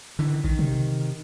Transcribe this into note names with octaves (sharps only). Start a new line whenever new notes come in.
D3 E3
A1 D#3
C3